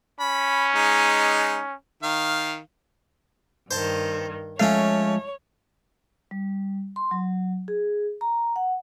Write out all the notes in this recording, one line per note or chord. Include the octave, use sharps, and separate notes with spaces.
C#4 B5
G#3 D#4
D#3 F5
G2 D#3 C5 A5
F3 G#3 A3 C#4 C#5 F5
G3
C6
F#3
G#4
A#5
F#5